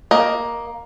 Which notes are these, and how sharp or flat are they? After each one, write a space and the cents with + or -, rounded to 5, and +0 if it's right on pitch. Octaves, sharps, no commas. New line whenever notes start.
A#3 +10 D#5 +0